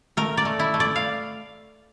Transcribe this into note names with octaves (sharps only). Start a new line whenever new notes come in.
A3 A#4
D5
A3
E4
A3
D5
F5